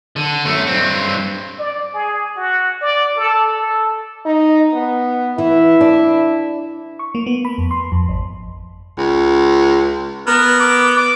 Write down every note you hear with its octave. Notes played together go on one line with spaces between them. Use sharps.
D3
F#2 A3
G2 C4
D5
G#4
F#4
D5
A4
A4
D#4
B3
E3 E4
D4
C#6
A#3
B3
B5
F2
C6
F2
G#1
C#2
B3 A#4
D6
D6